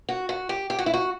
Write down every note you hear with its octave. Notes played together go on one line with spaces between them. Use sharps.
F#4
F#4
G4
G4
F#4
E4
F#4